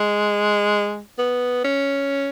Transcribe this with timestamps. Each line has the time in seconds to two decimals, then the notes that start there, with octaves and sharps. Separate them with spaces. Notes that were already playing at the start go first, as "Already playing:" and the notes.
Already playing: G#3
1.19 B3
1.64 C#4